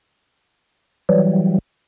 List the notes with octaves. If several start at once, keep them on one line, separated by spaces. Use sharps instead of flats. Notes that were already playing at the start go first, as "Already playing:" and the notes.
E3 F#3 G3